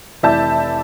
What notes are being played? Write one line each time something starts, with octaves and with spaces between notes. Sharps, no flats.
F1 E3 D5 E5 A5 G6